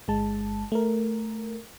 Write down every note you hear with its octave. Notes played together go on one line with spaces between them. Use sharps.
G1 G#3 A5
A3 A#4